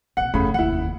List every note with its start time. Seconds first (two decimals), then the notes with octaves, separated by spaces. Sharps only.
0.17 A#1 C3 F#5
0.34 F#1 E2 A2 C#3 B5
0.54 F1 D#2 E4 F#5